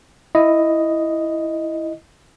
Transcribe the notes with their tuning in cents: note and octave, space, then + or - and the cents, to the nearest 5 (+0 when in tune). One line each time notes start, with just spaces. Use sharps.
E4 +0 D#5 +0